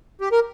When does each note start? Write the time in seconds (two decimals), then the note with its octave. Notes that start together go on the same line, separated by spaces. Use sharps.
0.21 G4
0.32 A#4